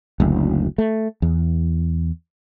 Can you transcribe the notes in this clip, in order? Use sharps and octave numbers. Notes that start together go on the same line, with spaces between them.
F#1 D2
A3
E2